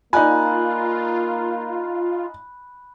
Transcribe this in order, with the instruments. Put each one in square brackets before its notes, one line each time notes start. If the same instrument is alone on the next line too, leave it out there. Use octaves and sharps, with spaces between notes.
[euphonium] A#3 [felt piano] D#4 D5 G#5 [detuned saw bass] F4 [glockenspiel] B5 F#6